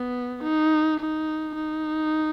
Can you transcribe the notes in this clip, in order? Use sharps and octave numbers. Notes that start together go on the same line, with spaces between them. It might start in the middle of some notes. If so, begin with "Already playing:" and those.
Already playing: B3
D#4
D#4
D#4